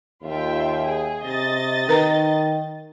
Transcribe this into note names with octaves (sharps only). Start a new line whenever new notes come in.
D#2 F4 E5 G5
G#4
C3 D#5 A6
D#3 A#4 B4 A#5